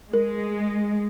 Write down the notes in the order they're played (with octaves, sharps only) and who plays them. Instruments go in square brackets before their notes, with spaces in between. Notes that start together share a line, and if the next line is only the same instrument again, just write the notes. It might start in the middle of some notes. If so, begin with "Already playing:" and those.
[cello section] G#3 [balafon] A#4